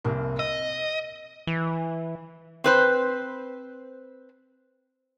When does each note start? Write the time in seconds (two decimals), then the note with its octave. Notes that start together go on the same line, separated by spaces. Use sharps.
0.04 F1 C2 A#3
0.39 D#5 E6
1.47 E3
2.64 C4 B4 C5